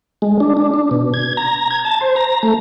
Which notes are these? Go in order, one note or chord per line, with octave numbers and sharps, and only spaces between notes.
G#3
D4
D4
D4
B2
G#6
A#5
G#6
A5
C5
A#5
A3